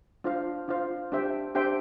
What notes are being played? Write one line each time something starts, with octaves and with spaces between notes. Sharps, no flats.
D4 F4 C5 F5
D4 F4 C5 F5
D4 G4 C5 E5 G5
D4 G4 C5 E5 G5